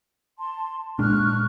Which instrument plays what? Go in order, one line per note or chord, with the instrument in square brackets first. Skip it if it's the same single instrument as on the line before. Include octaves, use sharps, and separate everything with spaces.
[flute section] A5 C6
[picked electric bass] A#2 G#3 D4 [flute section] C#6 F6 F#6